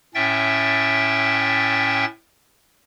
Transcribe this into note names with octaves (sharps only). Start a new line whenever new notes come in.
A2 C#4 E5 G5 A6